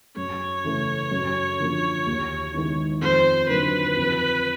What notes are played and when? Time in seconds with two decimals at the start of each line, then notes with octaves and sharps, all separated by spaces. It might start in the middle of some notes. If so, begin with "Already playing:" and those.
0.17 F#2 C#5
0.64 C#3 E3 A3
1.11 F#2
1.60 D3 F3 A#3
2.07 D#2
2.54 D#3 G#3 B3 E4
3.01 F2 C5
3.49 D3 F#3 A#3 D#4 B4
3.97 F2